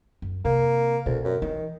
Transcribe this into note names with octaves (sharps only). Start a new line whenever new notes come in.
F#2
C3 A#3
D2 B2
F#2
D#3 E3